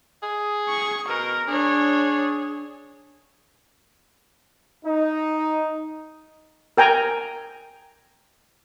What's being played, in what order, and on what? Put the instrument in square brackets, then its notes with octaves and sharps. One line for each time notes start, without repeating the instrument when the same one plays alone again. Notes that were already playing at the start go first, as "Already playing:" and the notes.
[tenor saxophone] G#4
[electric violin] C#6
[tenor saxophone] B2 [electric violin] A#4
[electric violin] D4 C#5 [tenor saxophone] G#4
[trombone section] D#4
[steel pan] A#4 G5 G#5 A#5